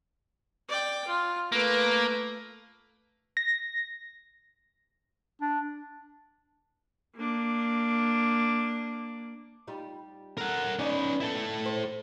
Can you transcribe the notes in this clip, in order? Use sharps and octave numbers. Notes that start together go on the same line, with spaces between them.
D5 G5
F4
A3 A#3 B4
A#6
D4
A#3 D4
G3 D#4 F4
A4 A#4 F#5
B3 C#4 D#4 D5
E4 A4
C5